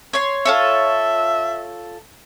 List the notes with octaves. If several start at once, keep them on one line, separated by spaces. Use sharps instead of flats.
C#5 C6
F4 A4 C#5 E5